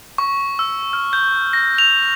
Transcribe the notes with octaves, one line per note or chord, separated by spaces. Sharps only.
C#6
E6
F6
G6
A#6
F7